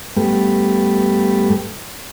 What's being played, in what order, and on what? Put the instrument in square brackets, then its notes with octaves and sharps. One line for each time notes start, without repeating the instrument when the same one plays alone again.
[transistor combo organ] G2 G3 A3 B3